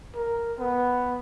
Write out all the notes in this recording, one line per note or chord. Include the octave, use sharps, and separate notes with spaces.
A#4
B3